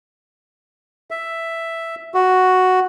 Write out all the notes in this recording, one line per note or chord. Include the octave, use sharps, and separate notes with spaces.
E5
F#4